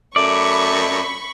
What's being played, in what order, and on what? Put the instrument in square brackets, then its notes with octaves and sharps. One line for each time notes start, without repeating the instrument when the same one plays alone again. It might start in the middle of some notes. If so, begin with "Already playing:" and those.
[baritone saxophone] F#2 [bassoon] A3 [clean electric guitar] D5 [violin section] B5 C#6